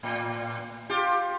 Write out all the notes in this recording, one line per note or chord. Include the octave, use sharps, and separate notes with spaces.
A2
F4 G4